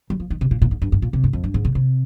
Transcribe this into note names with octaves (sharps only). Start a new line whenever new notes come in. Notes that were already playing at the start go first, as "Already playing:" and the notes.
G3
F3
D#3
C3
A#2
A#2
G#2
G2
G2
A#2
C3
G#2
F2
G2
G#2
C3
C3